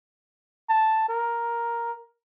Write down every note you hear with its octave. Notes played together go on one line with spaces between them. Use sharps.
A5
A#4